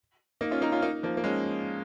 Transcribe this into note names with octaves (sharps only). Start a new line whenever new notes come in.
A#3 D#4
C#4 F4
A#3 D#4
C#4 F4
A#3 D#4
F3 A#3
A#3
G#3 C#4